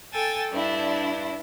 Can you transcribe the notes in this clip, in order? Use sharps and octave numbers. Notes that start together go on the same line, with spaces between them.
A4 G5 G#5 A6
G2 D4 E4